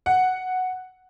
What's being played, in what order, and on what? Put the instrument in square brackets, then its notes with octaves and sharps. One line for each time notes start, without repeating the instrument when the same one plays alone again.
[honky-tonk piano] F#5